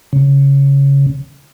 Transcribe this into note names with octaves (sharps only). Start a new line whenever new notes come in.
C#3